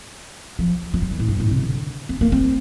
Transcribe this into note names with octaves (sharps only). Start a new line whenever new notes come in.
F3
F3
G3
D#3
A2
G2
A2
C3
D3
C4
A#3
C4